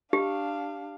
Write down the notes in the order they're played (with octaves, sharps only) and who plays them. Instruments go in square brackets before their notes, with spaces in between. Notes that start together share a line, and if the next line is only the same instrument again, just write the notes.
[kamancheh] D4 F5 [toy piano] G4